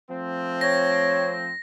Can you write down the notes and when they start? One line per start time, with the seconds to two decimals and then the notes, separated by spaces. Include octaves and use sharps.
0.11 F3 A3 C4
0.61 C#5 A#6